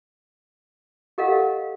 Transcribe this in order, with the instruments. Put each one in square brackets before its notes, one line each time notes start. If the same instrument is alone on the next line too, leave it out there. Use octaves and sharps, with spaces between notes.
[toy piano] G4 A4 A#4 D#5 F5 F#5